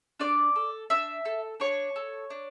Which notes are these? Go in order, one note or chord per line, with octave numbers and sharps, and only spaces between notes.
D4 D5 D6
A4
D4 E5 E6
A4
D4 C#5 C#6
A4
D4